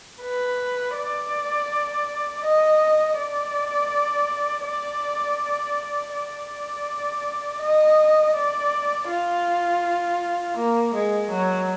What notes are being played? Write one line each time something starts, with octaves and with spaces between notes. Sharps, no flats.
B4
D5
D#5
D5
D5
D5
D#5
D5
F4
A#3
G#3
F#3